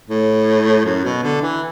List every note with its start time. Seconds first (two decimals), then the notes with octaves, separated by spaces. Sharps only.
0.10 A2
0.86 F#2
1.05 B2
1.23 D3
1.42 E3